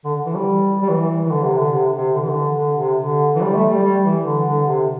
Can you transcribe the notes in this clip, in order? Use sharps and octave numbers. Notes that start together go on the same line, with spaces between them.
D3
E3
G3
G3
E3
E3
D3
C3
D3
C3
C3
D3
E3
D3
D3
C3
D3
E3
G3
A3
G3
G3
E3
D3
D3
C3